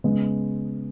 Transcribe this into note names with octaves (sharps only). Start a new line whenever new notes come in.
C#3 G#3 B3